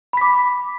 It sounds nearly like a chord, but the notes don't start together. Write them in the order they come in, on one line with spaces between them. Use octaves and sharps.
B5 B6 D6